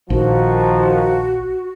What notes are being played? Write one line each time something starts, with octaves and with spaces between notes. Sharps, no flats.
A#1 D#3 F3 F#4